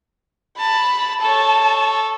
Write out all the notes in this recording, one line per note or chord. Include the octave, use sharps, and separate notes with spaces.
A5 B5
A4 C#5 A5